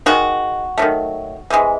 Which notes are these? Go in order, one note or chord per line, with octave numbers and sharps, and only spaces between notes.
D#3 G#3 F#4
D#3 F#3 A3
C3 E3 G#3